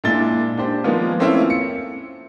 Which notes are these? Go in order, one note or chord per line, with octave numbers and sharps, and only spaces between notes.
A#2 G#3 D4 E4 A6 G7
D4 G4 C5
D#3 F3 G#3 A#3 B3 F4
A3 A#3 C4 C#4 E4 F4
C#7